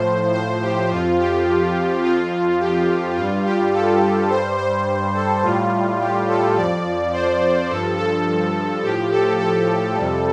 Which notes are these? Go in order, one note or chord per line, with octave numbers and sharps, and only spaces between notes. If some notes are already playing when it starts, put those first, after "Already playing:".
Already playing: A2 F3 C5
C5
G4
F2 F3 F4
G4
F2 F3 F4
G4
G2 G3 F4
G4
A4
G2 G3 C5
C5
A4
A2 G3 F4
G4
A4
F2 F3 D5
C5
G2 F3 A4
A4
A2 F3 G4
A4
A4
F2 C3 G3